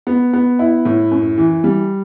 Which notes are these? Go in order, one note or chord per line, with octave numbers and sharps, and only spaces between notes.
B3
B3
E4
A2
F#2
E3
G3